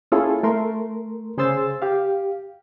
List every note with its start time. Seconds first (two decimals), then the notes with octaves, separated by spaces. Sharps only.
0.12 A#3 C#4 E4 F4 G#4 A4
0.43 A3 A#4 C6
1.38 C#3 G#4 C5 C6 E6 A6
1.82 G4 F5